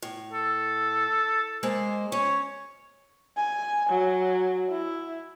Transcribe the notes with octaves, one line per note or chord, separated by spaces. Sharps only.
A2
A4
G#3 A#3 C5
C#4 C#5
G#5
F#3
E4